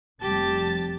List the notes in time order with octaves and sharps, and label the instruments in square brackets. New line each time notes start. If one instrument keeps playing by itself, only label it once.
[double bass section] F1 C3 G3 [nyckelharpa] G4 [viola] A5